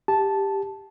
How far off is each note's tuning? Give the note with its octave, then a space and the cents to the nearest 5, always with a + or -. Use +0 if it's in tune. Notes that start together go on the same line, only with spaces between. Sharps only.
G4 +10 A5 -10